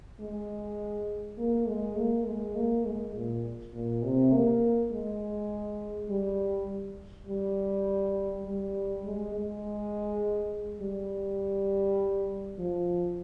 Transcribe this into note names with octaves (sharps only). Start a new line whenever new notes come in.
G#3
A#3
G#3
A#3
G#3
A#3
G#3
A#2
A#2
C3
A#3
G#3
G3
G3
G3
G#3
G#3
G3
F3